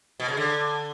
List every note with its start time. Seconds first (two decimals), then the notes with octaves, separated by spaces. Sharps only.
0.20 B2
0.28 C#3
0.37 D3